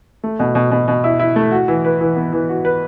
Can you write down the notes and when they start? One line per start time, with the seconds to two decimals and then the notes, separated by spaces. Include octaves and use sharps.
0.24 A3
0.39 B2
0.55 B2
0.71 B2
0.88 B2
1.04 E4
1.19 E4
1.36 A3
1.52 F#4
1.68 E3
1.85 B4
2.01 E3
2.16 B3
2.33 E3
2.49 F#4
2.65 B4